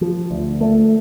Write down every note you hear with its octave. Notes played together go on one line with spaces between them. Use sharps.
F3
D2
A3